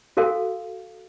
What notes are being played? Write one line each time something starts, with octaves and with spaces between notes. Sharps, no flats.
F#4 A4 A#4 F5 G#5